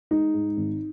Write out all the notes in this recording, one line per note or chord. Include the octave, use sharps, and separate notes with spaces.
G#3 D#4
G#2
G#1